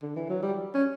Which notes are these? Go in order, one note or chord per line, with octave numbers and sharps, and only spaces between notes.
D3
E3
F#3
G3
C#4